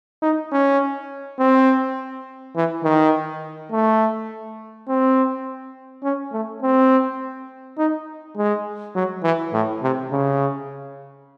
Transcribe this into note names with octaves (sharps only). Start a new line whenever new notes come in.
D#4
C#4
C4
E3
D#3
A3
C4
C#4
A3
C4
D#4
G#3
F#3
E3
A2
C3
C#3